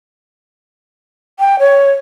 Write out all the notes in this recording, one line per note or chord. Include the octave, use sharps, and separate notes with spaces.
G5
C#5